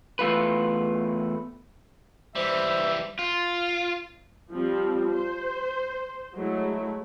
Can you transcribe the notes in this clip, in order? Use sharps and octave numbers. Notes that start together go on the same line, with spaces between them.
E2 A3 F4 B4
E3 G3 C5 E5
F4
F3 G3 C4
C5
F#3 G#3 A3 E4